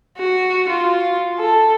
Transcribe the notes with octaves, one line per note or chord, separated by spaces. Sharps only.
F#4
F4
A4